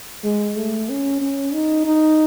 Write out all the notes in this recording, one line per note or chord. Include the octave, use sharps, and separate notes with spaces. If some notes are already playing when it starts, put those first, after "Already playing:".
G#3
A3
C#4
C#4
D#4
D#4